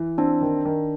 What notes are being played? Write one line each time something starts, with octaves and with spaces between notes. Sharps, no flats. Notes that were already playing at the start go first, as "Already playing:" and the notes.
Already playing: E3
C4 D4
D#3
D#3